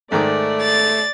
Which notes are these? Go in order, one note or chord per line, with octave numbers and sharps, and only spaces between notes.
G#2 D#3 A3 D5 D6
A6